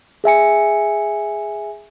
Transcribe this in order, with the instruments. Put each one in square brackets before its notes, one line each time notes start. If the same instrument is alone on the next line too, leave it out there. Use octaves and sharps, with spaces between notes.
[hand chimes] G#4 E5 G#5 C#7